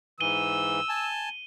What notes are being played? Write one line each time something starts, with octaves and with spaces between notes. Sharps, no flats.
G#2 E3 E6 D#7 G7
G#5 A5